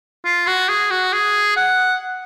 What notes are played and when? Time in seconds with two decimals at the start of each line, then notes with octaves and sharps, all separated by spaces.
0.25 F4
0.47 F#4
0.69 G#4
0.91 F#4
1.13 G#4
1.57 F#5